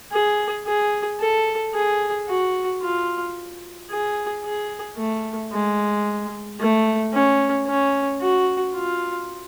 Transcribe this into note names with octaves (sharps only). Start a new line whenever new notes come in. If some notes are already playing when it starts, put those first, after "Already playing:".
G#4
G#4
A4
G#4
F#4
F4
G#4
G#4
A3
G#3
A3
C#4
C#4
F#4
F4